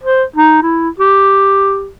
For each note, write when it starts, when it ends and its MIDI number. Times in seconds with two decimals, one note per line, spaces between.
0.04 0.24 72
0.36 0.60 63
0.62 0.89 64
1.00 1.89 67